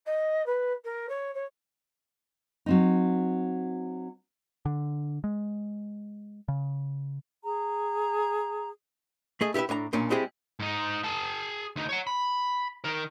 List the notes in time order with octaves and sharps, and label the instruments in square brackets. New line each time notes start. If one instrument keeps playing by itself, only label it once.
[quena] D#5
B4
A#4
C#5
C#5
[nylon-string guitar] F#3 C4 D#4
[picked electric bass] D3
G#3
C#3
[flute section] G#4 A#5
[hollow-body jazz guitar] A3 G#4 D#5
E4 G4 G#4 B4 E5
A2 D4 G#5 A#5
B1 A#2 C#4 D4
G3 G#3 C4 E4 G4 G#4
[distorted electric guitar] G#2 D#4
G#4 A5
D2 D#4
C#5 F#5
B5
D#3 A#4